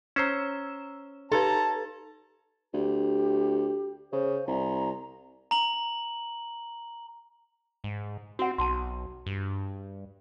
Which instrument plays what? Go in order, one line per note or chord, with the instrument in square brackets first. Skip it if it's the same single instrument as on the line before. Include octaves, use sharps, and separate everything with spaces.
[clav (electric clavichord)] C#4 C5 [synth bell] A#5 E6 E7
[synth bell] D#4 G4 B4 [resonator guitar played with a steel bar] A4 [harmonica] A5 A#5
[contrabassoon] D2 [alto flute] G4
[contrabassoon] C#3 [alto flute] C5
[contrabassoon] C2 [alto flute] A#5
[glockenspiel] A#5 F#7
[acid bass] G#2
[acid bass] C4 [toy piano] F#4 F#5
[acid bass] B1 [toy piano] A5 C6
[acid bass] G2